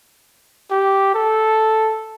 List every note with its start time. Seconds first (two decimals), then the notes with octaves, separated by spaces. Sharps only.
0.71 G4
1.14 A4